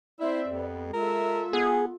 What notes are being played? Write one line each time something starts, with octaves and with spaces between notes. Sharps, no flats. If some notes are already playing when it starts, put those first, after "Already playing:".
C4 E4 C5 D5 E5
F2 B3 G4
G#3 F4 A4 A#4 E5
B3 G#4